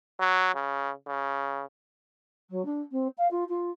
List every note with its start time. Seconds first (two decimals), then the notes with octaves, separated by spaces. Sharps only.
0.20 F#3
0.55 C#3
1.07 C#3
2.50 F#3
2.65 D4
2.91 C4
3.17 F5
3.30 F4
3.48 F4